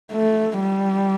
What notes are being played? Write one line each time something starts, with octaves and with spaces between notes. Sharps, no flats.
A3
G3